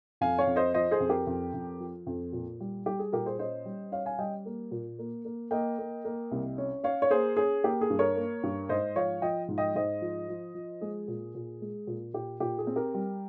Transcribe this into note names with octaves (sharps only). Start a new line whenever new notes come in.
F2 F5 G#5
C#5 F5
F2
C5 D#5
F3 C5 D#5
G#4 C5
F2
G4 A#4
F2
F2
F3
F2
A#2
G3
G3 G4
G#4
A#2 G4 A#4
G#4 C5
C#4 C5 D#5
G3
C#4 C#5 F5
F5 G#5
G3 D#5 G5
A#3
A#2
A#3
A#3
A#3 D#5 G5
A#3
A#3
C2
C#4
C#4 C#5 F5
C#5
A#3 G#4 C5
C#4 G#4
A#3 G4
G#4
G2
A#4 C#5
A#3
G2
G#2 C5 D#5
F3 C#5 F5
F3 D#5 G5
G#2
D#5 G5
G#2 C5 D#5
F3
F3
F3
G#3 G#4
A#2
A#2
G#3
A#2
A#2 G4
A#2 G4
G#4
C4
G4 A#4
G3